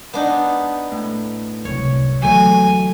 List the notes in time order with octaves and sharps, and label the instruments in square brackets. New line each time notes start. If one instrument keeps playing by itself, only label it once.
[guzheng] B3 D4 D#4
[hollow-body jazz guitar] A2
[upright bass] D1 C2 [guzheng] C#5
[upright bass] D2 [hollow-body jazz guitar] E3 F#3 A3 [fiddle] G#5